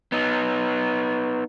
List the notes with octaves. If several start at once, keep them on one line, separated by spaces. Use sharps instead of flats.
B3 D#4